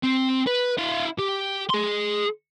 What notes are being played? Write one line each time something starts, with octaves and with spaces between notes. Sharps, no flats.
C4
B4
E4 F5
G4
G#4 C6